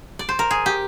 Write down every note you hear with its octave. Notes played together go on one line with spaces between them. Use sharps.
D5
C5
A#4
G#4
G4